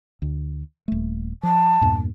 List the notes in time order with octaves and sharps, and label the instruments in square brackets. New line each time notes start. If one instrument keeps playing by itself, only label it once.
[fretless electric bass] D2
D#1 A3
[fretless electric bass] F3 [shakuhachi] A5
[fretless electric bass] E2 G2 A#2